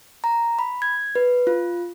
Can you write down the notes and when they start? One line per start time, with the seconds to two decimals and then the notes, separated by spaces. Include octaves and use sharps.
0.24 A#5
0.59 B5
0.82 G#6
1.15 B4
1.47 F4